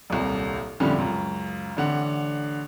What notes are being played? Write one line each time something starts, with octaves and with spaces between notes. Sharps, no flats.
D#1 C2
F2 A2 D3 G3 C#4
C#2 F#2
A1 D3 F#5